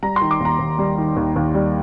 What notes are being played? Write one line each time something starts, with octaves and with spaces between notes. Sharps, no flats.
G3 A#5
C6
D#3
D6
D#2 A#5
D#2
G3
D#3
D#2
D#2
G3